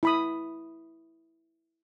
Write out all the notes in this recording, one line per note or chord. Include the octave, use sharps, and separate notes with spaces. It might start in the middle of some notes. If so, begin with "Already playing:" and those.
E4 B5 D#6